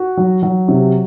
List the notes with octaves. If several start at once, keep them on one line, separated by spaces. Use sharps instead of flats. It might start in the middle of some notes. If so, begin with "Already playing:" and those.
Already playing: F#4
F#3
F#3
C3